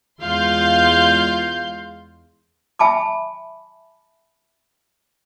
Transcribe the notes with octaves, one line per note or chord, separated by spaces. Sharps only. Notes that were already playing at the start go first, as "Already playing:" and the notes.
E2 G#3 F4 F5 C6 G6
E5 G#5 A5 B5 D6